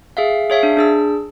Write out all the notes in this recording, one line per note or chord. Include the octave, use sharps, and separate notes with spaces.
G#4 E5 F5
G#4 C#5 E5 F5
D4
D4 G#4 E6